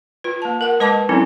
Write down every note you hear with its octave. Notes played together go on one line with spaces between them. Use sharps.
F4 B4
A#3 A5
A#4 F#5
G#3 B4 D#5 A5 D6
F#3 C4 C#4 D#4 E4 A4